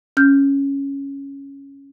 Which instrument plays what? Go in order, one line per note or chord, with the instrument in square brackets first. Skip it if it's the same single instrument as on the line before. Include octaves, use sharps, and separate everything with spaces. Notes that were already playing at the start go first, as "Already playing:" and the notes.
[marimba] C#4 F6 G6